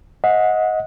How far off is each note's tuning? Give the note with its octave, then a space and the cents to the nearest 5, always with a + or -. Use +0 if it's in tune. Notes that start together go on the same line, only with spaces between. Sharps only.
D#5 +20 F#5 -20